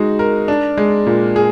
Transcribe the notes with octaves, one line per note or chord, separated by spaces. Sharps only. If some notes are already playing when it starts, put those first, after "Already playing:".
Already playing: G#3 D#4 F#4
A#4
D4
G#3
A#2
G#4